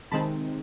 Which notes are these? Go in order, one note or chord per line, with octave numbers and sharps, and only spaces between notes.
C3 D#3 G#3 C4 D#4 A5 B5